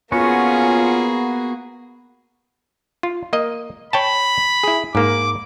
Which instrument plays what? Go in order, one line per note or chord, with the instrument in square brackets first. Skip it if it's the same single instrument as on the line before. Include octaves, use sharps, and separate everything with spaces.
[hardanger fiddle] A#3 G#4 [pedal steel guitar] B3 F#4 [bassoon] C#4 [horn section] F4
[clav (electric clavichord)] F4
A#3 D#5
[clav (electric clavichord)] C#5 G5 A5 [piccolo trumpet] B5
[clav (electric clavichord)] E4 G#4
[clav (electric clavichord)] G#2 A#3 [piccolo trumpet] D6